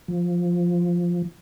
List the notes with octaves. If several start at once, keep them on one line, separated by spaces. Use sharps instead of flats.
F3